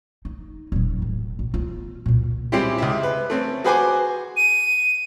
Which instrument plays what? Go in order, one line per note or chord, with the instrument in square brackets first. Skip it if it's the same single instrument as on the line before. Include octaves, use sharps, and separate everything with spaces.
[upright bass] D#4
D#1 F#3
A2
A#1
B3 F4
C#2 A#2
[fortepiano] G3 G#3 C4 C#4 E4 G4
C#2 E5
B4
A3 C4 C#4
F#4 G#4 B4 C5 G#5 D6
[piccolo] D#7